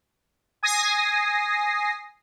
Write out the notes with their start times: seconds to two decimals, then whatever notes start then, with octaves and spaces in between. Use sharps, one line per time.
0.63 G#5 D#6 A#6 C7